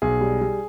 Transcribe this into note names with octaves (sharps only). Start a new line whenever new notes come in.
B1 G#4
G3
G3